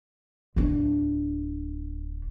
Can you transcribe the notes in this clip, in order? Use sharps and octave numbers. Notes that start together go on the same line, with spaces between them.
D1 D4